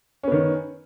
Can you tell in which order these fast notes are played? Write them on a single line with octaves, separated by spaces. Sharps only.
C#4 B3 D#3